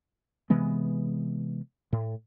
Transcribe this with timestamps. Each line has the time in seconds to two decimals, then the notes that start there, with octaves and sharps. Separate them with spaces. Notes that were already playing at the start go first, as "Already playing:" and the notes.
0.50 C3 E3 G#3 B3
1.93 A2